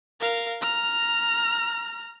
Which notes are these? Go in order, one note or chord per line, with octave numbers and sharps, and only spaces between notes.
A#4 F5
A#5 F6